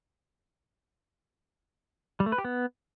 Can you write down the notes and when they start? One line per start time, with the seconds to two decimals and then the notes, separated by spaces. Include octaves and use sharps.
2.20 G3
2.26 A3
2.32 B4
2.38 G4
2.45 B3